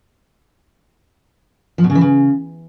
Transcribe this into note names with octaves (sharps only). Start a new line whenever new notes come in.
F3
B2
C#3
E3
C#3